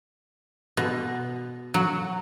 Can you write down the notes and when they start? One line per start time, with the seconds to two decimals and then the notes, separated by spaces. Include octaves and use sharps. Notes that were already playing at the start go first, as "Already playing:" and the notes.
0.77 B2
1.74 F#3